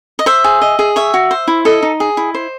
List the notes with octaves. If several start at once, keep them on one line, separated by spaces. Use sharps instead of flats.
D#5
C5 E5
G#4
D#5
G#4
C#5 E5
F#4
C5
E4
A4 D#5
D#4
G#4
E4
C5